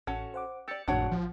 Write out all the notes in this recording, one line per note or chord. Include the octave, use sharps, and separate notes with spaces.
A1 C#4 F#4 A4
C5 F#5 D6
G4 D5 E6 A6 C#7
G#1 F2 A2 D4 F#4 C#5
A#1 F3